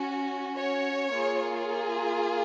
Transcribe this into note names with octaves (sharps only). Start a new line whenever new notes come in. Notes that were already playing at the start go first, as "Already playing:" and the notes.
Already playing: C#4 F#4
C#5
A#3 F4 G#4